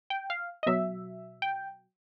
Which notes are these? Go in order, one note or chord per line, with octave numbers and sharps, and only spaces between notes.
G5
F5
D#5
B2 F#3 E5
G5